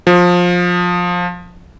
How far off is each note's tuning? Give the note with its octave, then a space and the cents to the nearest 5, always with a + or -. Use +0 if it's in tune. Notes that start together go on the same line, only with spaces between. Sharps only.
F3 +20